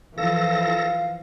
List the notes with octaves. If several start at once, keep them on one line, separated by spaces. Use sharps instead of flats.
E3 F3 A4 F5 A#6